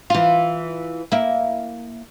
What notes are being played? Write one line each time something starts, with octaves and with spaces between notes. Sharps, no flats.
E3 F4
A#3 E4